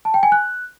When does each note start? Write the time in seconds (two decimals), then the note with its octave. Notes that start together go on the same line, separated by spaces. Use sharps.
0.05 A5
0.14 G5
0.23 G#5
0.32 F#6